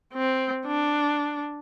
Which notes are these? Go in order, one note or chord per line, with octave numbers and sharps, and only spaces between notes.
C4
D4